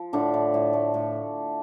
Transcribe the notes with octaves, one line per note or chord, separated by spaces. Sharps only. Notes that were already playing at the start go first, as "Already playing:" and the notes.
Already playing: F3
A2 D3 D4
A2
A2
A3
A2